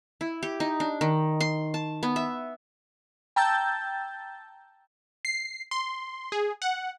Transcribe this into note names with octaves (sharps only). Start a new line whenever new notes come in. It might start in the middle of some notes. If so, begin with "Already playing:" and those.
E4
G4
D#4
D4
D#3
C6
A5
B3
E5
G5 A5 A#5 E6 G6 A6
C7
C6
G#4
F#5